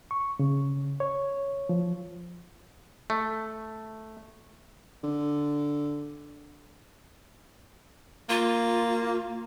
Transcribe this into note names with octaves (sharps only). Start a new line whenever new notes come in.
C#6
C#3
C#5
F3
A3
D3
A#3 F4